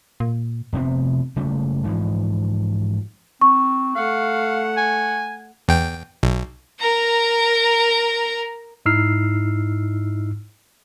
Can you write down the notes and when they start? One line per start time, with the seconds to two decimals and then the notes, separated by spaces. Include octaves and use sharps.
0.20 A#2
0.73 F1 C3 B3 C4
1.36 F#1 C#3 G3 A3
1.84 G#2 E3 F3
3.41 C4 C#6
3.95 A3 F5 F#5
4.77 G#5
5.68 E2 G5
6.23 B1
6.79 A#4 A#5
8.85 G#2 D#4 E4 E6 F6 C7